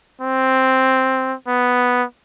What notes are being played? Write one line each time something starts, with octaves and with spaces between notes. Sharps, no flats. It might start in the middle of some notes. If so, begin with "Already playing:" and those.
C4
B3